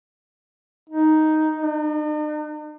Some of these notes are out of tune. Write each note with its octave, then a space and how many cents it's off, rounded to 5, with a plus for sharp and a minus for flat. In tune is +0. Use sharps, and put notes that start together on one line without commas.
D#4 +5
D#4 -45